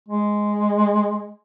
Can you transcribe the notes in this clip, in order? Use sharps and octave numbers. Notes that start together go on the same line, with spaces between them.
G#3